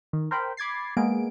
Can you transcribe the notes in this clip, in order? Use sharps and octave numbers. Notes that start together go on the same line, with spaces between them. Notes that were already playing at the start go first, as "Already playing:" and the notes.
D#3
A#4 C5 G5 B5
B5 D6 G#6 A6 C7
G#3 A#3 B3 G#4 D7